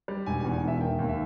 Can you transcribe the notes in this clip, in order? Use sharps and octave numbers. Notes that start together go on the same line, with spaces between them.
G3
E1 G#5
G#5
E2
G#5
E1 E5
D#3 G5
D#2
E5